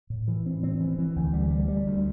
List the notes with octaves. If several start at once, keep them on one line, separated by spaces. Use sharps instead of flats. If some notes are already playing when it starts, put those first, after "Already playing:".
A2
E3
C4
C4
E3
E3
D2
G3
G3
G3
D2